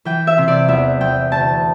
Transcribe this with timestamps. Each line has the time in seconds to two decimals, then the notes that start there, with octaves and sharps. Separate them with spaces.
0.05 E3 G5
0.27 E5
0.38 C3
0.48 D5
0.68 E2 E5
1.01 E2 G5
1.32 D2 A5